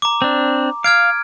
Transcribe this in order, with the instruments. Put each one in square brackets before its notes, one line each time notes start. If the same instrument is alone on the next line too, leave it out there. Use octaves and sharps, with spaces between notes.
[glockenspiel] A#5 D6
[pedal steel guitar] C4 D4
[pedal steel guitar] F5 [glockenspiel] F6 G#6 D7